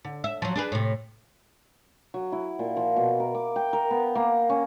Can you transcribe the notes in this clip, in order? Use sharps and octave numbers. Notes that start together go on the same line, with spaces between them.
D3
E5
F3 F#3
D4 G#4 B4
A2 C3
F#3
E4
A#2
F3
B2
A#4
D6
G5
A#4
B3
A#3
C#4